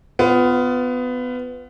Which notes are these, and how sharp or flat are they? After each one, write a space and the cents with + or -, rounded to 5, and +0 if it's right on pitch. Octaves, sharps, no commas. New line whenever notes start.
B3 +20 F4 +0